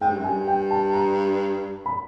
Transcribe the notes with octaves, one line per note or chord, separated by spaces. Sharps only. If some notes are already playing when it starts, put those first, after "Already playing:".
G#2 G5
G2
F#2
G2 G#5
G5
A5
A#5
B5